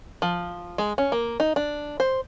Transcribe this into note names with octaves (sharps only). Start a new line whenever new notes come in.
F3
G#3
C#4
A#3
D#4
D4
C5